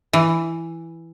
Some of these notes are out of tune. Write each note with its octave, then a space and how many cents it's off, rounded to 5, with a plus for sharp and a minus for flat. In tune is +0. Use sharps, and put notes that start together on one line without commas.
E3 +5